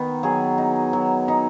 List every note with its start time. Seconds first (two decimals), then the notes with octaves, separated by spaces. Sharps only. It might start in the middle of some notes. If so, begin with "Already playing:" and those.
Already playing: D#3 B3 D#4
0.23 F#3 G#4
0.58 D#4
0.93 F#3
1.28 D#4